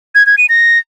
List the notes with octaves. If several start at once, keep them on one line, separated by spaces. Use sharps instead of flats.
G#6
G#6
D#7
A#6